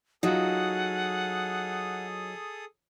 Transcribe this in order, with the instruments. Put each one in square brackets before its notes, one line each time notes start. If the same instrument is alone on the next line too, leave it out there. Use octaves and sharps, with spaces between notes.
[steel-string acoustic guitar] F#3 [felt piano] D#4 F4 [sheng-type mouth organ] G#4 A4 D#6 [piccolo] F#5